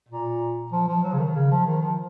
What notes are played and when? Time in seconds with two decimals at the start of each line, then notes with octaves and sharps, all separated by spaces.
0.09 A#2
0.72 F3
0.88 F3
1.04 F#3
1.13 C#3
1.19 D#3
1.35 C#3
1.51 F3
1.67 D#3
1.82 F3